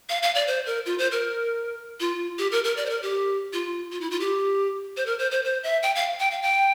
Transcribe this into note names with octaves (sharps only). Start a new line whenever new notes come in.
F5
F5
D5
C5
A#4
F4
C5
A#4
F4
G4
A#4
A#4
D5
C5
A#4
G4
F4
F4
E4
F4
G4
C5
A#4
C5
C5
C5
E5
G5
F5
G5
F5
G5